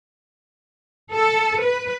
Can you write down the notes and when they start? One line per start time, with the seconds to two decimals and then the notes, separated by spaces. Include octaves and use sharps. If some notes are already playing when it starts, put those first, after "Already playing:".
1.13 A4
1.62 B4